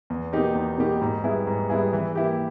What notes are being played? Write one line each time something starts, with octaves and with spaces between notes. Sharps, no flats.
E2
B2 A#3 D#4 G4
E2
B2 A#3 D#4 G4
G#2
G3 B3 E4 G#4
G#2
G3 B3 E4 G#4
E3
A#3 E4 G4